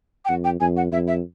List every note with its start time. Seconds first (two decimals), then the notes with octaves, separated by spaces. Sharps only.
0.25 G5
0.29 F2 F#5
0.44 G5
0.60 F2 G#5
0.77 F#5
0.92 F2 E5
1.07 E5